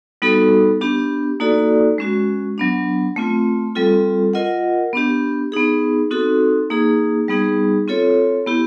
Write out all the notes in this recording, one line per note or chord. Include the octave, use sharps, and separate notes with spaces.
G3 B3 D#4 F#4 A4
B3 D4 G4
A#3 D#4 F#4 A4 D5
G#3 C#4 F#4
F#3 B3 D4
A3 C4 F4
G3 C4 F4 A4
F4 A#4 D#5 F#5
B3 D4 G4
B3 D#4 G#4
C4 D#4 F#4 A4
A#3 D#4 G#4
G3 B3 D#4 G#4
C4 F4 A4 C#5
B3 E4 G4